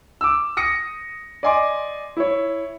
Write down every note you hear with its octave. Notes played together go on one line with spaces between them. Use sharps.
D6 E6
D#6 A#6 C#7
D5 D#5 G#5 C6 D6
E4 C#5